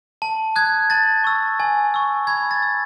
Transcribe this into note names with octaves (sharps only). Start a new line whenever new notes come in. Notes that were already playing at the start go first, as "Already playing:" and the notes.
A5
D#6 F#6 G#6
A5 A6
C#6 E6
G#5
C#6 E6
B5 G#6
A6
E6